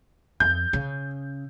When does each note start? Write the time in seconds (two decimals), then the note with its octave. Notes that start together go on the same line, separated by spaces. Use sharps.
0.40 F2 G6
0.73 C#3